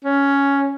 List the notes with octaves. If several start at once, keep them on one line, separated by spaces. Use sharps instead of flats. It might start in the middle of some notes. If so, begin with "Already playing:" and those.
C#4